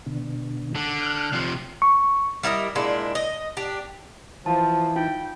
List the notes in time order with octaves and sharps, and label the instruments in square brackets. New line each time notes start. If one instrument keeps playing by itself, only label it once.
[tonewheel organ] B2 D3
[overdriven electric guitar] D3
[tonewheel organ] F6 F#6
[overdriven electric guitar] C3 F3
[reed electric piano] C#6
[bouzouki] G3 E4 A#4 D#5
A#2 G#3 D4 E4
D#5
D4 G4
[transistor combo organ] E3 [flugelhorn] F3 [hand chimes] A5
[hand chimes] D#4 F4 [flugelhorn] G5